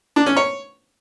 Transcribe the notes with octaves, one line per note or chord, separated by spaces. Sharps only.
D4
C#4
C#5